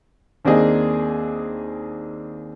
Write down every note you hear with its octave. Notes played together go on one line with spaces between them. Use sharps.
D#2 A#3 C4 D4 G#4 D#5